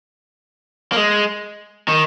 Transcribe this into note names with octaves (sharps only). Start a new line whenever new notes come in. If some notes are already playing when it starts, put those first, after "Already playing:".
A#3
G#3
D#3